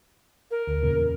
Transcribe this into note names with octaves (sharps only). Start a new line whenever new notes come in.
A#4
D2
E2 A#2 C#3